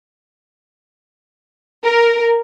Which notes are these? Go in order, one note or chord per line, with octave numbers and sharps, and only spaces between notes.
A#4